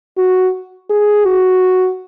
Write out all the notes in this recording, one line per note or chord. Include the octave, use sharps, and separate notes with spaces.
F#4
G#4
F#4